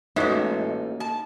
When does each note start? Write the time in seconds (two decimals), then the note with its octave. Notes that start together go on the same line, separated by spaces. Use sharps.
0.16 A1 A2 G#3 A#3 D#4 F#4 E5
1.00 A5